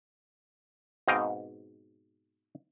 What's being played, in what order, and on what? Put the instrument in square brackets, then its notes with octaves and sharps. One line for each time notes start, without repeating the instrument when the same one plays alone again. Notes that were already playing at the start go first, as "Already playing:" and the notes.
[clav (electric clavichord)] G#2 B2 C4 D#5 F5 G5